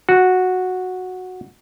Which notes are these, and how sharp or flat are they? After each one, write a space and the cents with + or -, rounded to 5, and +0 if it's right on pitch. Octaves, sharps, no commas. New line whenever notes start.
F#4 -10